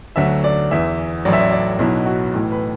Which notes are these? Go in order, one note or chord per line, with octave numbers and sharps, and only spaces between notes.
D2 D3 F#3 E5
D5
E2 E3 E5
A1 A2 F#3 D5
E5
D5
D5
B1 B2 F#3 E4
F#4
A1 A2 E3
B4